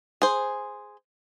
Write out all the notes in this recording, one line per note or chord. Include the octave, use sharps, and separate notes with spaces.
G#4 C5